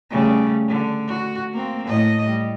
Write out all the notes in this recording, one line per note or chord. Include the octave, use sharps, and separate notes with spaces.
C#3 G3 A3
D3
F#4
A#3 C4
A2 D#5
G3